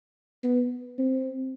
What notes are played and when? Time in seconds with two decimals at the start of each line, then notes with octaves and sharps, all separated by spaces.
0.44 B3
0.99 C4